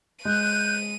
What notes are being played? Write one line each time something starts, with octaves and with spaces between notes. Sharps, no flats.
G#3 F#6 G6 D#7